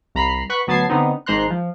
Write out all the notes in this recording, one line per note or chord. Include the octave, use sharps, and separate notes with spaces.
C2 A#5 B5 B6 C7
B4 F#5 B5 C#6 F#6
D2 F#3 B3 A5 G#6 C7
D3 B3 C4 D#4
G#1 G#2 C5 A#5 C6 F#6
F3